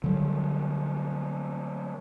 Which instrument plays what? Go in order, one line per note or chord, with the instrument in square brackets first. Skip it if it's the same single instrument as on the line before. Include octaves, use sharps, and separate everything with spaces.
[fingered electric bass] D3 F#3 G3